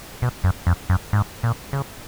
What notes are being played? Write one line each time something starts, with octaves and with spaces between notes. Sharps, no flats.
B2
F#2
F2
F#2
G#2
A#2
C#3